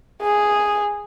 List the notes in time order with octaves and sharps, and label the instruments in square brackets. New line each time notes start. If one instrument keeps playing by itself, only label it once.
[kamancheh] G#4